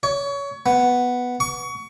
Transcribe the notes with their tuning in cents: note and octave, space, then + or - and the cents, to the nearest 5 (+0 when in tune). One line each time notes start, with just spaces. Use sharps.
C#5 +25
B3 +0
C#6 +25